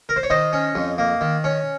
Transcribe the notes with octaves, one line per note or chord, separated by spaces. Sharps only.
A#4
C5
C#5
D#3 C5 D#5
C#4
F2
A#3
D#3
C#4